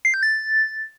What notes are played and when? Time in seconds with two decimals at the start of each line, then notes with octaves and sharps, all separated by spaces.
0.05 C7
0.14 G6
0.23 A6